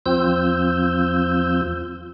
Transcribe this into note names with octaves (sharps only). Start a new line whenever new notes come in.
E2 F3 C4 F4 E6 G6